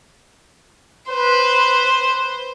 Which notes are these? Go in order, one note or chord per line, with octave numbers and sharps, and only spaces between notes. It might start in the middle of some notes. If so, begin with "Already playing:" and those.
B4 C5